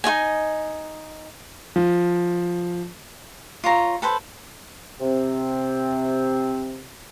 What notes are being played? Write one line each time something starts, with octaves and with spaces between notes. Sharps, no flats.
D#4 F#4 D#5 G#5
F3
F4 C#5 A#5
A4 B4 C5
C3 C4